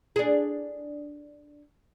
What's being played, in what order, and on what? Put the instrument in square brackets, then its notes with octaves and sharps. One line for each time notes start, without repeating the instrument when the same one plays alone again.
[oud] D4 G#4